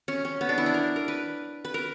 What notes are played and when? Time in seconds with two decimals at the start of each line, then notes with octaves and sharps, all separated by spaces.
0.08 C#4
0.25 C#4
0.41 B3
0.49 D4
0.58 E4
0.66 D4
0.74 A#4
0.96 A#4
1.08 B4
1.65 B4
1.74 A#4